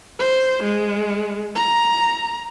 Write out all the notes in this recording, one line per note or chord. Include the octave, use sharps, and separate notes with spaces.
C5
G#3
A#5